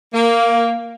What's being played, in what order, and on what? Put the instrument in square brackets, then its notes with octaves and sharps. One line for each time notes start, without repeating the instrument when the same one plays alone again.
[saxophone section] A#3